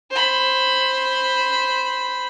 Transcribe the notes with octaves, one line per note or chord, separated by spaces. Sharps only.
C5 B5